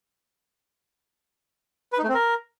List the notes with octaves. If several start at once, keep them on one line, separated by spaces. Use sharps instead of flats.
B4
D#4
A3
C4
A#4